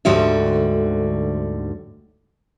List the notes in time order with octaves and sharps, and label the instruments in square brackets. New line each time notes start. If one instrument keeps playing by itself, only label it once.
[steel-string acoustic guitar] D2 G#2 D3 G3 F#4 E5